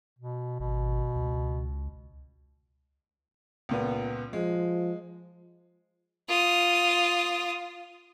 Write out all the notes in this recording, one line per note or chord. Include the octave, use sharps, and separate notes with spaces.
B2
G#1 B2
C#2
C#2 A#2 B3
F3 G#3
F4 D#6